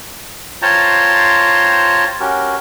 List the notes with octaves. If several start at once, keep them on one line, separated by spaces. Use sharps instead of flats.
F4 C5 C#5 G5 A5 A#5
C#4 F#4 G4 A#4